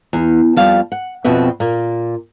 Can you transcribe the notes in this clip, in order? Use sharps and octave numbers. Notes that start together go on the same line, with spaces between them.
E2
F2 G3 F5 A5
F#5
F2 B2 C4 F#4 B4 E5
A#2 A#3